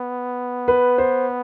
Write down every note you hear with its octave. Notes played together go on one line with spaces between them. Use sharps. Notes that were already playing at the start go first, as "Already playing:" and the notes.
Already playing: B3
B4
C5